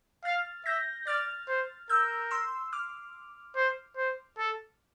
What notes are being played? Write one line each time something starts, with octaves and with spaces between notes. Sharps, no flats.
F5 F6 A6
E5 G6 A#6
D5 F6 A6
C5
A#4 E6 G6
C6 E6
D6 F6
C5
C5
A4